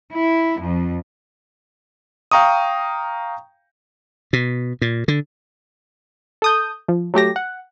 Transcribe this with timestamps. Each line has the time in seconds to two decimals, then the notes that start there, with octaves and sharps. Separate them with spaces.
0.13 E4
0.62 F2
2.32 F5 G5 A#5 C#6 D#6
4.33 B2
4.82 A#2
5.08 D3
6.42 A4 D#6 G6
6.88 F3
7.14 F#3 A3 G4 A#6
7.36 F#5